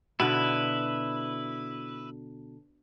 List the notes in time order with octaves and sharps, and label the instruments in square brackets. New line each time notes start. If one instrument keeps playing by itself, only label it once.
[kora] B2 D3 [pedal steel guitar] E4 B4